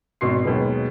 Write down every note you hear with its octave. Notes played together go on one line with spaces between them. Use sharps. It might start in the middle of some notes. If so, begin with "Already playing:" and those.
G#1 B2 F#4 C6 C7
D#2 B2 F#3 G#3 B3